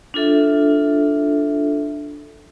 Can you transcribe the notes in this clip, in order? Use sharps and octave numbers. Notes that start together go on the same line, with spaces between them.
D4 F4 A4 E5